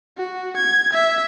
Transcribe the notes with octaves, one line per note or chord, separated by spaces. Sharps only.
F#4
G#6
E5